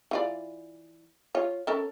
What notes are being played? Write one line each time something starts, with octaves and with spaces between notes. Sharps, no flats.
E3 F4 D5
F4 C#5
C#4 A4 A#4